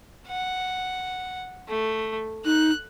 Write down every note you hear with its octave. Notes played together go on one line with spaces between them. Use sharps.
F#5
A3
D#4 F#6